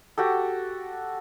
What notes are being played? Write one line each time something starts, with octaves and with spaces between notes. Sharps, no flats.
F#4 G4 A4